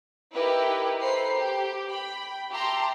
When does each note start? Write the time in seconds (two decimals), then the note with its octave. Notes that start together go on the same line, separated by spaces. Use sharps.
0.33 D#4 E4 G4 A#4 B4
0.99 A4 B4 C5 A#5 B5 C7
1.34 G4
1.88 G5 B5
2.52 G4 E5 A5 A#5 C6